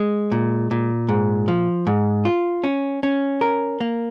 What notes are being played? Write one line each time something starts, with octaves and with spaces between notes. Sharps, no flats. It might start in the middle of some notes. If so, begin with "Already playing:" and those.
Already playing: G#3
A#2
A#2
G#2
F3
G#2
F4
C#4
C#4
A#4
A#3